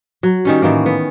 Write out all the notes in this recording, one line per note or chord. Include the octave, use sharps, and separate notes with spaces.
F#3
D#3 G3 C#4
A2 D#3 E3 A#3
B3